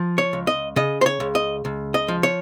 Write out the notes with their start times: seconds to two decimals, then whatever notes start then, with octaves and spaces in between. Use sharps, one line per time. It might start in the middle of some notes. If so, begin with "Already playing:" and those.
Already playing: F3
0.18 C#5
0.33 C#2
0.47 D#5
0.76 C#3 D#5
1.01 C5
1.06 C#5
1.20 C#2
1.35 D#5
1.65 C#2
1.94 D#5
2.08 F3
2.23 C#5